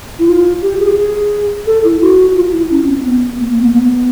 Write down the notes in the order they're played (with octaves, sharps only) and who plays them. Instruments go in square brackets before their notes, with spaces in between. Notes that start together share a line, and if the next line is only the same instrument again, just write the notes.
[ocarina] E4
F4
G4
G#4
G#4
A4
E4
F#4
F4
E4
C#4
C4
B3
A#3
B3
A#3
B3